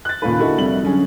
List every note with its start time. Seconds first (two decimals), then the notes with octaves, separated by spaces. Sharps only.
0.05 F#6 A6
0.22 D#2 A#2 C#3 F4 B4
0.39 D3 D#4 E4 F#4 A4 A#4
0.58 F1 F2 G3 E5 F#7
0.83 D3 F#3 C#4 G#4